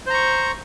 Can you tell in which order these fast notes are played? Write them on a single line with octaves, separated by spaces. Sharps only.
C5 A#5 C#6